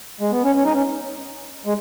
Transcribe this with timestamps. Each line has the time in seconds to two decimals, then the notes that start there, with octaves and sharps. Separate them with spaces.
0.20 G#3
0.32 B3
0.44 C#4
0.56 C#4
0.65 D#4
0.74 C#4
1.65 G#3